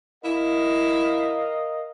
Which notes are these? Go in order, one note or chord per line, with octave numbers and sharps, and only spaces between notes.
E4 A#4 D#5 F5